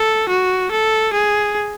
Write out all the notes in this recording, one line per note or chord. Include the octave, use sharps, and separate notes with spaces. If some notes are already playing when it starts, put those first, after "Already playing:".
Already playing: A4
F#4
A4
G#4